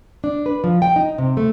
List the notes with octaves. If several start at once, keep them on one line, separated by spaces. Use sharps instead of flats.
D4
B4
F3
G5
D#4
C3
A3